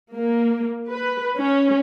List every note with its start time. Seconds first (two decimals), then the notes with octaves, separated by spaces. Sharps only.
0.14 A#3
0.88 B4
1.37 C#4